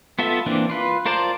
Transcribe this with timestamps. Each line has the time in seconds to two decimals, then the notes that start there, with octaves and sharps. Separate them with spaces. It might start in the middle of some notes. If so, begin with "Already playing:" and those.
0.19 B3 F4 A4 E5
0.46 E3 A#3 C4 D4
0.70 F4 B4
1.06 F4 A#4 C5 D5 A5